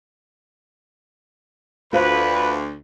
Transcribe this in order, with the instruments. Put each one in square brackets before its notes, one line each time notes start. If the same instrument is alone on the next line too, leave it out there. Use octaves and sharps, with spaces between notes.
[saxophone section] D2 [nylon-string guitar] F4 C5 F5 [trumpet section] B4